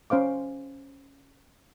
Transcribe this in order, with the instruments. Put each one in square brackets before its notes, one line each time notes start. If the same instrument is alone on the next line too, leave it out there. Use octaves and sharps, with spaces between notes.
[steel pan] C#4 C5 F5 D6